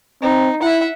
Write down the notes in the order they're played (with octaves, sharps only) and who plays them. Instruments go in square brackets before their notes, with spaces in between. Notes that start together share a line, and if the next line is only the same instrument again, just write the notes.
[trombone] C4 [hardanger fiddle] D#4
[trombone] E4 [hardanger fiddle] E5 F#5